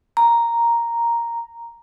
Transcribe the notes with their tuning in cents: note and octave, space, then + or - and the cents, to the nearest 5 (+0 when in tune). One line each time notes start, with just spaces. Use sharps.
A#5 +0